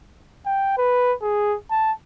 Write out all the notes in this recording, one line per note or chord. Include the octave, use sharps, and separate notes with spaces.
G5
B4
G#4
A5